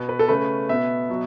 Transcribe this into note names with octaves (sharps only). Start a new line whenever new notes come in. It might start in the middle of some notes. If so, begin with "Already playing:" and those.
Already playing: B2 B3
B4
A4
C#3 A3 C#4 B4
B2 B3 E5
B2 F#3